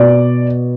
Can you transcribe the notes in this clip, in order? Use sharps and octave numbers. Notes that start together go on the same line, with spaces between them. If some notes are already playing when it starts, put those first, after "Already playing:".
Already playing: B2 D5